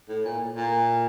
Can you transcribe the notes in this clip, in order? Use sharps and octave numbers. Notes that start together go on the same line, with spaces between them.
A2
A#2
A#2